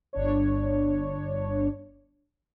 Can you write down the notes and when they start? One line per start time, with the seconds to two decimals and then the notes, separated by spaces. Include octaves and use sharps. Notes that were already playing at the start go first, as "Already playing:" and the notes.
0.13 G1 D4 C#5